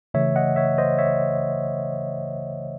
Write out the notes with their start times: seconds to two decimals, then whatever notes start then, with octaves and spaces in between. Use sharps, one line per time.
0.14 C#3 E3 A3 C#5 E5
0.36 D#5 F#5
0.56 C#5 E5
0.78 C5 D#5
0.98 C#5 E5